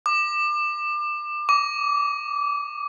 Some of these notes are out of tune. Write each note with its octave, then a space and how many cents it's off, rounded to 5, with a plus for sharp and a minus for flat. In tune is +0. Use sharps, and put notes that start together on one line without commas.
D6 +30
D6 -25